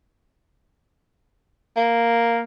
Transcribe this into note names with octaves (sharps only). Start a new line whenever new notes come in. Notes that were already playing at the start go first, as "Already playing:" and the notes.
A#3